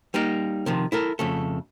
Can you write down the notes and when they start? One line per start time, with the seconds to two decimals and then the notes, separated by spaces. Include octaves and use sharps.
0.14 G3 A#3 D#4 A#4
0.66 C3 D#3 F3
0.92 E4 A4 A#4
1.19 F2 C#3 A3